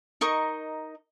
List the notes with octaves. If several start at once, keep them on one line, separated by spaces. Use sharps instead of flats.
D#4 A#4 D#5 C#6